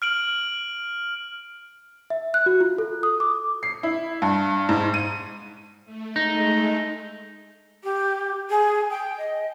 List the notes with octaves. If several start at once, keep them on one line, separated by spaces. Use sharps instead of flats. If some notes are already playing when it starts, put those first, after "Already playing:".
F6 D7 F#7
E5
F#6
F#4
F4
A4
D#6
D6
C7
E4
G2
G#2
D#7
A3
G#3 A3 D#4
G4
G#4
G5
D#5